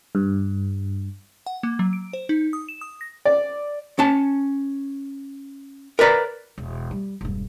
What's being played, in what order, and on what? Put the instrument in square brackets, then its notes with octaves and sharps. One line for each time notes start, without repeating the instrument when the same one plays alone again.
[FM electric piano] G2
[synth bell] F#5
A#3
F#3
D7
C5
D#4
D#6
E7
D#6
A#6
[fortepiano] D5
[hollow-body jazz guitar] C#4 A5
A#4 B4 D5 A#5
[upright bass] E1
G3
E1 G2